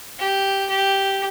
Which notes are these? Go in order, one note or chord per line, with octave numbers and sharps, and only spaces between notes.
G4
G4